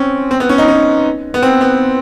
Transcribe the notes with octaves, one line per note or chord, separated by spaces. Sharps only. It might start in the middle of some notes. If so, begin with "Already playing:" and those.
Already playing: C4 C#4
C4
B3
C#4
D#4
C#4
B3
C4
B3